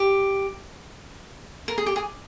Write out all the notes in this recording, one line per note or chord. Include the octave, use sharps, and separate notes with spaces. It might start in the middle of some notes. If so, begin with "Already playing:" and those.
Already playing: G4
A#4
G#4
G4
G#4